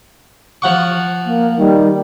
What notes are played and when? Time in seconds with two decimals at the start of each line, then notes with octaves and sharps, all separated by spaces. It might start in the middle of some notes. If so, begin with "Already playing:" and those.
0.62 F3 F#5 C#6
1.26 A#3
1.58 D#3 G3